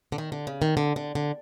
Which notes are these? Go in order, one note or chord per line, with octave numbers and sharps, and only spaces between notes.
D3
D#3
D3
C#3
D#3
D3
D3
D3